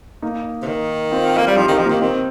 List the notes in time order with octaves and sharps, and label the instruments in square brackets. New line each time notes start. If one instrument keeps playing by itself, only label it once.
[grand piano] A#3 D#4
[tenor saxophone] C3
D#3
[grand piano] C4 F4
[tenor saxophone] A#3
G3
[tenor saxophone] F3 [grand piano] D#4 G4
[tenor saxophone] D#3 [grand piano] D#4 G4
[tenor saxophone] F3
[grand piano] A#3 D#4
[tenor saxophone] D#3
[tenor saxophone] D#3 [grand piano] C4